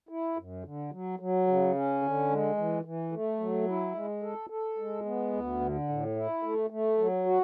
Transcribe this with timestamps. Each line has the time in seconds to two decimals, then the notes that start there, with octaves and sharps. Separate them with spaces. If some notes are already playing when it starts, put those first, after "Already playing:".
0.09 E4
0.37 F#2
0.64 D3
0.92 F#3
1.19 F#3
1.47 C#3
1.75 C#4
2.02 D3
2.30 G#3
2.57 E3
2.85 E3
3.12 A3
3.40 F#3
3.68 E4
3.95 G#3
4.23 A4
4.50 A4
4.78 G#3
5.06 B3
5.33 D2
5.60 D3
5.89 A2
6.16 E4
6.43 A3
6.70 A3
6.98 F#3
7.26 F#4